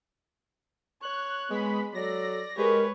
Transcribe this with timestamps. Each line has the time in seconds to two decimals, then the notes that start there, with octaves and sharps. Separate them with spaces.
1.02 C#5 F#6
1.50 G#3 B3 B5
1.94 F#3 A4 D5 A#6
2.57 G#3 G4 A#4 B4 C#5